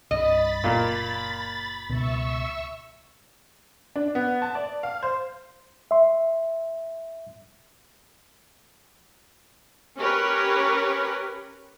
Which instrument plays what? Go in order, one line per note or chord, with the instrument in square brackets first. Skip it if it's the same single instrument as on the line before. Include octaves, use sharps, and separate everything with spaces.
[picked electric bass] C2 G2 [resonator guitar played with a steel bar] D#5 [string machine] B5 A6
[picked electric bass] F#1 [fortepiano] A#2 A#3
[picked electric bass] C#2 B2 [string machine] E5 C#6 E6
[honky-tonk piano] D4
B3
A5
D5
F5
C5
[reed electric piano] E5 C6
[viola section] C#4 G4 A#4 B4 C#5